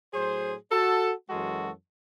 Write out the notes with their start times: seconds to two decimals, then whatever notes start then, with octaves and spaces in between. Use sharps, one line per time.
0.13 A2 F#3 G#4 C5
0.71 F#4 A4
1.30 F#2 E3 G#3 F#4 A4